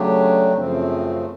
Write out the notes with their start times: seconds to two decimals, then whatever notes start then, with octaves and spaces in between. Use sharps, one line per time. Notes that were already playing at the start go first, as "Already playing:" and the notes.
Already playing: C#3 F#3 A3 D4 G4
0.53 F#2 C#3 F3 A3 C4